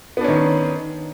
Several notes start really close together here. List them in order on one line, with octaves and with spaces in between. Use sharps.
B3 D4 C#4 D#3